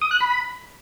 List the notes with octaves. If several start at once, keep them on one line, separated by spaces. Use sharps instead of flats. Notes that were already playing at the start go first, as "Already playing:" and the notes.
D#6
F#6
B5